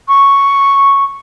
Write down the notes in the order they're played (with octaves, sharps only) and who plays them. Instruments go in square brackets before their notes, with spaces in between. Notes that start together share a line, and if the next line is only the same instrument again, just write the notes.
[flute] C#6